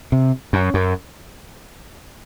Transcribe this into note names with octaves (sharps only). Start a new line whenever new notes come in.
C3
F#2
F#2